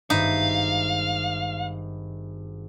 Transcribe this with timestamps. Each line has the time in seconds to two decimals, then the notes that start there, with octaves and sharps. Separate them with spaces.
0.10 G#1 G2 D#4 E5 F5